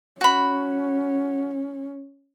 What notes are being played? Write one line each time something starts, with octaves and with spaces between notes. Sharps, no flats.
C#4 F#4 B5